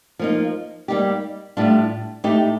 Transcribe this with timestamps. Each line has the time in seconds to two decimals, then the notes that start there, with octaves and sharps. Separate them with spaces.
0.19 F3 A#3 D#4
0.88 G3 A#3 D#4 G4
1.57 A2 G3 D4 F4
2.24 A2 A3 D#4 G4